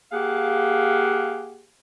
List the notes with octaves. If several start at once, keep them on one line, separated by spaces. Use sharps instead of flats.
A#3 G4 G#4 F5 F#5